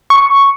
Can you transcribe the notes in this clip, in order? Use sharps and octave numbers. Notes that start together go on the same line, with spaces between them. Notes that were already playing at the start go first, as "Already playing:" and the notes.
C#6